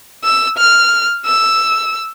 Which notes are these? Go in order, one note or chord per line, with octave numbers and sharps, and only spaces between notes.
E6
F6
E6